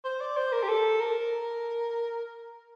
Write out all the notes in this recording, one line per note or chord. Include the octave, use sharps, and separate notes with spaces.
C5
D5
C5
A#4
G4
A4
A#4